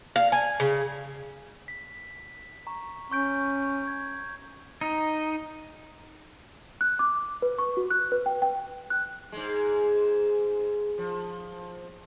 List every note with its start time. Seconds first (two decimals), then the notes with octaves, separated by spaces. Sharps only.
0.16 F5
0.32 G#5
0.60 C#3
1.68 B6
2.67 A#5 C#6
3.12 C#4 C#6 G6 D7
3.87 G#6
4.81 D#4
6.81 F#6
6.99 D6
7.42 B4
7.58 C#6
7.77 F#4
7.91 F#6
8.12 B4
8.26 G5
8.42 G5
8.90 F#6
9.32 G#2 G#3
10.98 F3